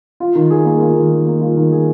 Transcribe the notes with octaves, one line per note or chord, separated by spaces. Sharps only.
F4
D#3
G#4
A#3
F4
D#3
G#4
A#3
F4
D#3
G#4